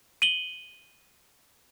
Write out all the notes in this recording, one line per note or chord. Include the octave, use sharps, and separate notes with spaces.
D#7 F#7 G7